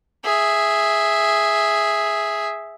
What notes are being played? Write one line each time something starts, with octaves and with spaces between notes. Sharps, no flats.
G#4 E5